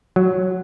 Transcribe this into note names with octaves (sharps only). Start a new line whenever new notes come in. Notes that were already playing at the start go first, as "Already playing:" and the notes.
F#3